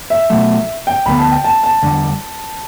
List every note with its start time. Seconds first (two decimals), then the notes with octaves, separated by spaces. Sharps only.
0.10 E5
0.30 B2 F#3 A3
0.87 G5
1.06 D2 D3 F#3 B3 B5
1.19 A5
1.32 G5
1.44 A5
1.63 A5
1.82 E2 D3 G3 D4